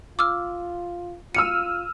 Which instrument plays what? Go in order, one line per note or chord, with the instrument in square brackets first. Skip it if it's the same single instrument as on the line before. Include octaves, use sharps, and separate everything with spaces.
[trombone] F4 [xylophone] D6 E6 F6
[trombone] F4 [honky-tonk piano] E6 F6 D#7 [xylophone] C#7